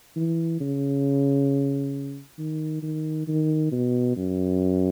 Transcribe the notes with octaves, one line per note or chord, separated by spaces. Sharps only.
E3
C#3
D#3
D#3
D#3
B2
F#2